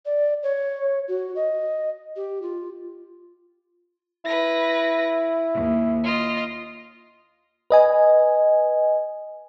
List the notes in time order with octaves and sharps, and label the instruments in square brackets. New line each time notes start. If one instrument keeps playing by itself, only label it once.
[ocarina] D5
C#5
F#4
D#5
G4
F4
[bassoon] E4 [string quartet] B4 A#6
[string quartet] D#2
F4 D#5
[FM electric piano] B4 D#5 G#5